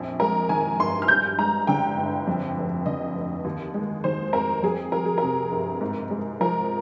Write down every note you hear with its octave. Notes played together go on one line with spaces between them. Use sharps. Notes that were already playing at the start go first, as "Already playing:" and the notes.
Already playing: A#1 F2
G#3 A#4
D#3 G#5
G1 C6
F6
G2 G6
G#3 A#5
D3 G5
G1
F2
F1
D3 D#5
F1
D#2
G#3
D#3 C5
F1 A#4
F2 G#4
G3 A#4
G#4
A#4
C3
G1
G#2
G#3
F3 A#4